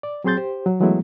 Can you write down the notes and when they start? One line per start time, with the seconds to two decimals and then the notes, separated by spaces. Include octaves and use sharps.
0.03 D5
0.24 F#3 C4 G#4 C6 G6 A6
0.37 G4 C5
0.66 F#3
0.80 E3 F#3 G#3 A3 B3 E4